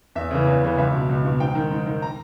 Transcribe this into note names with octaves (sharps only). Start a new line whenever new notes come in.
E2 E5
C#3 E3
E2
C#3 E3
C#2 E5
B2
C#2
B2
G#2 G5
D#3
G#2
D#3
A#5